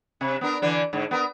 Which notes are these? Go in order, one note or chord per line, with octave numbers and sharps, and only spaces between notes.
C3
B3 D4 A#4
D3 E3 D4
G#2 D3
B3 A#4